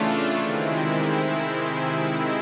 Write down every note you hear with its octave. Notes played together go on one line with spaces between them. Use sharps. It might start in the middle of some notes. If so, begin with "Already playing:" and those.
Already playing: C#3 E3 A3 D4 F4
C3 D#3 G#3 C4 E4